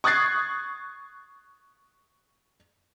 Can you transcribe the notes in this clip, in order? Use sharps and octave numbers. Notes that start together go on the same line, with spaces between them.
C#6 D#6 F#6 G#6 A6 C7